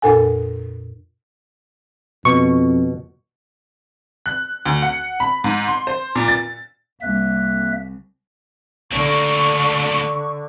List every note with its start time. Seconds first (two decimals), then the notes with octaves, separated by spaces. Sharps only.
0.02 F2 A#2 D4 A4 F#5 G#5
2.25 F2 B2 C#6
4.26 F#6
4.66 D2
4.82 F#5
5.20 B5
5.44 G#2
5.68 C6
5.87 C5
6.15 A#2
6.28 A6
7.02 C2 A#3 E5 F#6
8.92 D2 D3 A#3 C#6